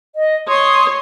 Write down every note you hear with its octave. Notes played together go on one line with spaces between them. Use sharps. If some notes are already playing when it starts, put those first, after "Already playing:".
D#5
C#5 C6 D#6